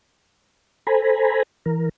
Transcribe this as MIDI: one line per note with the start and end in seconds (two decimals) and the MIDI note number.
0.87 1.43 69
0.87 1.43 72
0.87 1.43 80
0.87 1.43 82
0.87 1.43 83
1.66 1.89 52
1.66 1.89 70